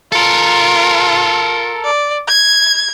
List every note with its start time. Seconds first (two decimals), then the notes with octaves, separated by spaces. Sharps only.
0.12 F4 A4 A#4
1.84 D5
2.28 G#6